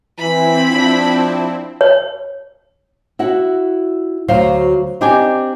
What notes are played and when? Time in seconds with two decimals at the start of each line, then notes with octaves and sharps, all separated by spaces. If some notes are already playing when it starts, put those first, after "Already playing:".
0.19 E3 C4 E4 B5
0.71 F3 D4
1.81 C#5
3.19 E4 F#4 F#5
4.28 D2 F#3 F#4 C5 F5
5.01 C4 D4 D#4 G4 D#5 G#5